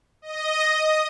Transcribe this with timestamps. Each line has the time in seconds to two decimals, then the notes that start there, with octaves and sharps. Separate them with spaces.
0.22 D#5
0.68 D#6